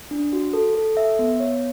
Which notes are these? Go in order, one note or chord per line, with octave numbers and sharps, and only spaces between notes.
D4
F#4
A4
A4
E5
B3
C#5